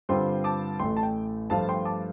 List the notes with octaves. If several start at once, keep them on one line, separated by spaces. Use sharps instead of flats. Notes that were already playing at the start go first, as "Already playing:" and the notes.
G2 D3 G3 C4 F4 G5 C6
A5 D6
A1 A2 A3 G5 C6
A5
G5
G2 F3 A3 F4 F5 A5
G5 C6
A5 D6